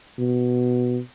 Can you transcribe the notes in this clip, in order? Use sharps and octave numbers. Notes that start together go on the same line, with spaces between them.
B2